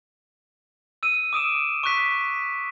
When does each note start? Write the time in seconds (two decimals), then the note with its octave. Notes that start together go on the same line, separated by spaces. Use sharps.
1.03 E6 D#7
1.33 D6 D#6 D7 E7
1.83 C#6 D6 F#6 B6